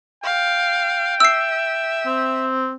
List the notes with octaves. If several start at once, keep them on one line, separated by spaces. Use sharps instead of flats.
F5 G5
E5 E6 C7
C4